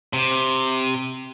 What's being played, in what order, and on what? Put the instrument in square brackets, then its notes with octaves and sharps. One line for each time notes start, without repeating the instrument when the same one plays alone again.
[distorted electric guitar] C3